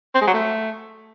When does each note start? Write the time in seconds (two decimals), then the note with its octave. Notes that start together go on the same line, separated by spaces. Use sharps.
0.15 C4
0.21 G#3
0.27 F#3
0.34 A3